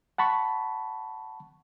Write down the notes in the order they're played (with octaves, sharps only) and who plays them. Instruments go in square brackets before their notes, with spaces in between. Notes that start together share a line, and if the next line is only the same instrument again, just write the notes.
[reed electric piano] F#5 A5 B5 C#6